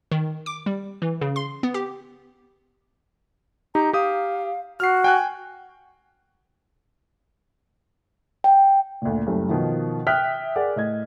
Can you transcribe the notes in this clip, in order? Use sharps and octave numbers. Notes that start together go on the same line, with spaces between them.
D#3
D6
G3
E3
C#3
C6
B3
G4
D#4 G4 A#5
G4 F5 D#6
F#4 F6 C7
G5 G#5 F#6
G5
D2 A#2
F#1 G3 A3
B2 D#3 F3
E5 G5 D#6 F6 F#6 B6
G#4 A#4 D5 F#5
A2 D#5 G#6